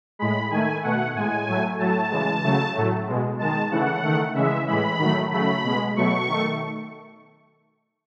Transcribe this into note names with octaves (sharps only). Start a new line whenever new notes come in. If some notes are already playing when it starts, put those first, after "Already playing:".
A2 G#3 B5
D#3 A3 G#5
B2 A3 F#5
A2 G#3 G#5
A2 F#3 A3
A2 F#3 A3 A5
C#3 E3 G#3
C#3 F#3 A3
A2 F#3 A3
B2 G#3
D#3 G#3 A5
C#3 E3 A3 F#5
D#3 A3
C#3 E3 G#3 E5
A2 E3 G#3 B5
D#3 F#3 A3
C#3 F#3 A3 B5
B2 G#3
B2 F#3 A3 C#6
D#3 A3